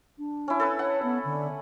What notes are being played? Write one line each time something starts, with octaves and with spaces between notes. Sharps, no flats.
D4
C#4 E4
A4 B4 E6
C#5 F#5
B3
D3